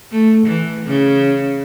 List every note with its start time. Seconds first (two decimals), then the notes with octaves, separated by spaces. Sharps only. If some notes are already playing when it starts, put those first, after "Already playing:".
0.12 A3
0.46 E3
0.85 C#3